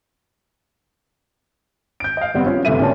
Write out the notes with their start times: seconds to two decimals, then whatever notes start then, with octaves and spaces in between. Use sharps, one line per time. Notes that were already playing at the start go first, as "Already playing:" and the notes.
2.00 G6 D7
2.17 D#5 F5
2.34 F#1 G3 B3 C4
2.46 C#4 F4 C#5
2.65 G1 C3 A3 E5 D#7
2.79 A#2 C#3 G3 C#4 D5 A5